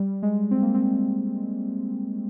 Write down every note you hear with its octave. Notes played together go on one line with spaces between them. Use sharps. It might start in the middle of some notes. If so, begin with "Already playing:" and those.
Already playing: G3
G#3
C4
A#3
C4